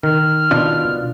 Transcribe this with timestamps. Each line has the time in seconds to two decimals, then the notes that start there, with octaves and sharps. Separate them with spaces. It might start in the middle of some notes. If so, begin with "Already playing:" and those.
0.03 D#3 F6
0.51 B2 D4 F4